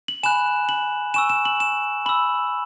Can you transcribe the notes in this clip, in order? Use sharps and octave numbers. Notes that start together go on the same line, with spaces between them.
F#7
G#5 B5 F#6 E7
F#7
G#5 C#6 E6 E7
E7
F#7
E7
B5 E6 F#7